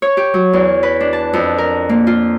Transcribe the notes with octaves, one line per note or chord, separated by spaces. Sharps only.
C#5
G4
F#3
E2
B4
D4
A5
F2
A#4
A#3
F4